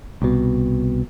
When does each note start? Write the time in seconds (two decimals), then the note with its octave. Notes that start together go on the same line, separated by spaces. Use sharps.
0.22 C2 B2